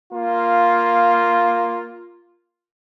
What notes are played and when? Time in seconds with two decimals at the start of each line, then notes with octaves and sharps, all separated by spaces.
0.12 A#3 F4